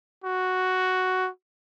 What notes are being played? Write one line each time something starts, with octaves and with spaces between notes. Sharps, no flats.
F#4